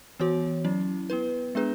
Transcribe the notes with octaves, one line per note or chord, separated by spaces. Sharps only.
E3 B3 F#4 C#5
F#3 C#4 E4
B3 E4 B4
G#3 B3 D4 G#4 B4